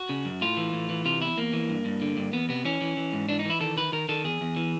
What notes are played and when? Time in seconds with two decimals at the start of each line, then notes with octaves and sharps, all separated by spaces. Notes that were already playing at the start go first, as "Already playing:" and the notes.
Already playing: F#4
0.09 C#3
0.25 F#2
0.41 A2 F4
0.57 E3
0.73 A2
0.90 E3
1.05 C3 F4
1.21 E2 E4
1.37 E2 A#3
1.53 E3
1.69 G2
1.85 G2
2.01 D3
2.17 G2
2.33 E2 B3
2.49 C3 B3
2.65 E3 C#4
2.81 E3
2.97 E3
3.13 G#2
3.29 E3 D4
3.39 D#4
3.45 E3
3.50 E4
3.61 D#3 A4
3.77 D#3 B4
3.92 D#3 A#4
4.09 D#3 A4
4.24 E2 G#4
4.41 E2
4.56 E3